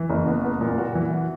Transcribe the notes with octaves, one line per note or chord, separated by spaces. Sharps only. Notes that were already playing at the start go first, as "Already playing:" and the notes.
Already playing: E3
F#1
B3
B3
A#2
F#4
E3